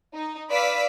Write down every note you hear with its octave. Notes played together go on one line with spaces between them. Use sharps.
D#4
B4 D5 F5 E6 B6